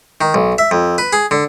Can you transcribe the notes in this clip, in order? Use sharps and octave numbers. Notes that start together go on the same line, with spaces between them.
D#3
B1
E5
F2
B4
G#4
D3